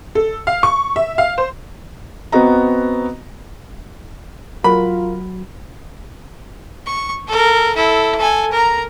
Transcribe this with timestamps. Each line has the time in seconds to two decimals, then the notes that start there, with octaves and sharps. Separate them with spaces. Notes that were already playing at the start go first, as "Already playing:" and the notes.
0.15 A4
0.47 F5
0.63 C#6
0.96 E5
1.18 F5
1.38 C5
2.32 B3 C4 F#4 D#5 A#5
4.64 F#3 F4 F#4 A#4 B5
6.86 C#6
7.27 A4 A#4
7.74 E4 A4
8.18 A4 G#5
8.52 A#4 A#5